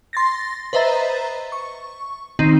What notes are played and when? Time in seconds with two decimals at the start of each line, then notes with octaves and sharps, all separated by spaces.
0.13 C6 A6 A#6
0.73 B4 C5 D#5 E5 A#5 A6
1.52 C#6
2.39 D#3 C4 D#4